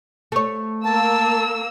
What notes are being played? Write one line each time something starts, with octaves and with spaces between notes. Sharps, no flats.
A3 C#5
A#3 A5 E6